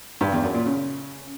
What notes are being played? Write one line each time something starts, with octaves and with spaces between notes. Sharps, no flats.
G2
E2
F#2
A#2
C#3